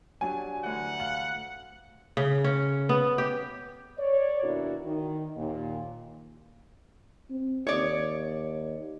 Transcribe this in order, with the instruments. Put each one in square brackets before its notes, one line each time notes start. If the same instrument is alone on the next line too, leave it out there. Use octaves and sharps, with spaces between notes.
[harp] F#3 D4 G4 [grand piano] G#5
[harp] D2 E3 [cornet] F#5
[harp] F5 [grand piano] F#7
[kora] C#3
C#4
B3
G4
[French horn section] C#5 D5
D#2 B2 D4 E4 F#4 A#4
D#3
D#2 A#2
[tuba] C4
[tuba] D#2 [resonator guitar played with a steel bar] C#5 D5